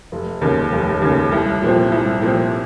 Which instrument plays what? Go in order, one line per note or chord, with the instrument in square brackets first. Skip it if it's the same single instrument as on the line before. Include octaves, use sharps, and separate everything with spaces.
[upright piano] F1
D#2 C#3
F1
D#2 C#3
C2
A#2 F3 C4
C2
A#2 F3 C4